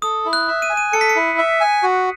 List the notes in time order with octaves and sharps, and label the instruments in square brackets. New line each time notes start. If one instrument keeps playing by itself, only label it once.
[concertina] A4 [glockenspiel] D#6
[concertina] E4
[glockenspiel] F#6
[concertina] E5
[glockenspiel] D#7
[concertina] G#5
[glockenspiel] D#7
[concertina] A4 [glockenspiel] C#7
[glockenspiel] B6
C#7
[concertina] E4
E5
G#5
F#4